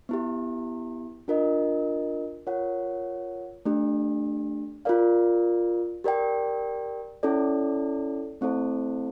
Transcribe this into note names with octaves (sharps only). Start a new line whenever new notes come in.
B3 E4 G4
D4 F4 A#4 D#5
F4 A#4 C#5 F#5
A3 D4 G4
F4 A#4 D5 F5
G4 A#4 D5 G5
C#4 E4 A4 D5
A3 C4 E4 A4 C5